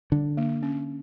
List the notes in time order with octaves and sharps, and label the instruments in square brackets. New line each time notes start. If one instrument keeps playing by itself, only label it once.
[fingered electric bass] D3 [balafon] G3
[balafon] A#3
C#4